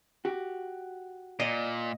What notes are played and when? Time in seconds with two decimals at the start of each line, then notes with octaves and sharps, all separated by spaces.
0.25 F#4 G4
1.40 A#2 D5 D#5